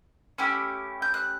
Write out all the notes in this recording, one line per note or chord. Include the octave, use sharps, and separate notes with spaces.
A3 C#4 E4 G4
G6
F#6